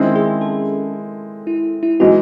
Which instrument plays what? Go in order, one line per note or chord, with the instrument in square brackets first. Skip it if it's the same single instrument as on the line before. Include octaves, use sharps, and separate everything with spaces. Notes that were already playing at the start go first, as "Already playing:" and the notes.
Already playing: [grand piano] D#3 G#3 C4 E4 [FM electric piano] C#4
[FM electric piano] G#4
A4
E4
E4
[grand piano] E3 G#3 D#4 [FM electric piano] F#4